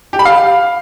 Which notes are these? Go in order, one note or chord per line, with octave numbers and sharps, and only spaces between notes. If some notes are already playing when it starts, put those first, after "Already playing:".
G4
B5
F5